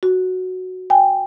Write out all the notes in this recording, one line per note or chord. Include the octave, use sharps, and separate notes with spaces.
F#4
G5 G#5